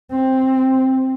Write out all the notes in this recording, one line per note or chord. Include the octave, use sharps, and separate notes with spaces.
C4